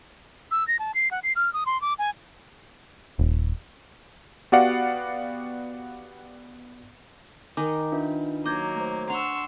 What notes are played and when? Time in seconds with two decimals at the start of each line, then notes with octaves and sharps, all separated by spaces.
0.51 E6
0.68 A#6
0.79 A5
0.94 C7
1.11 F#5
1.23 C7
1.36 F6
1.53 D#6
1.66 C6
1.81 D6
1.99 G#5
3.19 D#1
4.52 B3 F#4 G4 D5 F5 F#5
7.57 D#3 D#4 A#4 G#5 D6
7.92 D4 F4 B4 E5
8.45 F#3 A#3 D#5 D6 G6 G#6
8.76 A3 C5
9.10 D4 F#5 C6 C#6 E6 F7